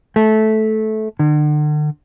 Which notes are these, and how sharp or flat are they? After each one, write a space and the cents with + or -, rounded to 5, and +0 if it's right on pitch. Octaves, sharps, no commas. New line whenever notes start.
A3 -15
D3 +40